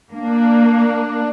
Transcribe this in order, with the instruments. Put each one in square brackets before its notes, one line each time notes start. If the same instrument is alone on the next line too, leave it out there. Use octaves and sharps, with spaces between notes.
[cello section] A#3 [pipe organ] D4